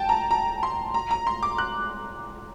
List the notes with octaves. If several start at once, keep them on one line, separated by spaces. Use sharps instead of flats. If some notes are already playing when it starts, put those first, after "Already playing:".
Already playing: G5 A5
A#5
A#5
C6
A#5
A#5
C6
D6
F#6